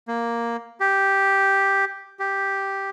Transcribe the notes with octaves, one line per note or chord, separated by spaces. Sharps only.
A#3
G4
G4